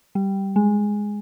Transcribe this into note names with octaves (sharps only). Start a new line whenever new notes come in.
G3
G#3